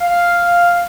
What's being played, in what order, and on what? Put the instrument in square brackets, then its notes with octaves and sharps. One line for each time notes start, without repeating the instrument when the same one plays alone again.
[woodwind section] F5